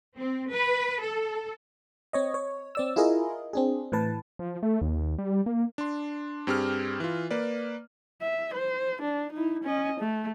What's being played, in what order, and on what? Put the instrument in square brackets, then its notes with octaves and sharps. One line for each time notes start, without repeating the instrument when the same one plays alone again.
[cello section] C4
B4
A4
[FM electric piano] C4 C#5 D#5
C#5
C4 D5 E6
E4 F4 G#4 A#4 D#5
C4 D4 G#4
A2 E3 B4 A5
[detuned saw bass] F3
A3
D#2
G3
A#3
[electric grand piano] D4 C6
G2 C4 G4 G#4 F6
E3 F4
A#3 B4 D5
[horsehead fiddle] E5
C5
D4
D#4 E4
C#4 D#5
A3